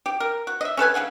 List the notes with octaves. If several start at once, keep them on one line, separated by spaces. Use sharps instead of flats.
G4
A#4
F#4
D#5 E5
C#4 A4 B4 G#5
C#3 G#4 F#5 G#5